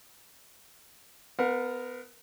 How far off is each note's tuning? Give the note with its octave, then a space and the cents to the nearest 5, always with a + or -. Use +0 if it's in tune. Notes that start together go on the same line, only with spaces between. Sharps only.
B3 +25 A#4 +0 F#5 -35